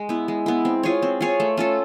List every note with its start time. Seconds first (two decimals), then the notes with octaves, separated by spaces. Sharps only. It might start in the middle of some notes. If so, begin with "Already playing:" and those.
Already playing: G#3
0.09 B3 E4
0.28 G#3
0.46 B3 E4
0.65 C4
0.83 F4 G#4 C#5
1.02 C4
1.21 F4 G#4 C#5
1.40 A3
1.57 C#4 F4 A4